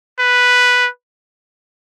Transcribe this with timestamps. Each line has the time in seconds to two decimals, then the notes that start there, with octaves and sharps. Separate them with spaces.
0.19 B4